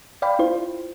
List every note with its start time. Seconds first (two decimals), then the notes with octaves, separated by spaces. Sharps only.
0.22 D5 F5 G5 B5
0.39 E4 F4 C5